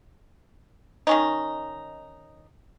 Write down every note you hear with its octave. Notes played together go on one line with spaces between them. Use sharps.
D#3 C#4 D#4